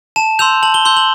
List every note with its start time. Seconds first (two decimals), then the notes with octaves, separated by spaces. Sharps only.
0.16 A5 E7
0.39 C6 E6 G6 F7
0.63 A5 F#7
0.74 G7
0.85 C6 E6 G6 G7
0.96 F#7